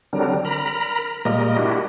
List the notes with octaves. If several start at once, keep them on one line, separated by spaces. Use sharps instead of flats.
D3 F#3 G3 C4 D4 A#4
A#4 A#5 B5
A#2 G3 G#3 A#3 A#4 D#5
D4 E4 F#4 G4